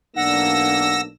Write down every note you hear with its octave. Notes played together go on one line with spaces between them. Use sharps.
B1 A#3 D4 F#5 E6 A#6